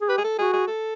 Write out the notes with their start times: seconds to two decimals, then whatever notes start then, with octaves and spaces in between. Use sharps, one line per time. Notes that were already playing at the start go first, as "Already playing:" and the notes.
0.01 G#4
0.09 G4 B4
0.18 G#4
0.24 A4
0.39 F#4 G#4
0.53 G#4
0.67 A4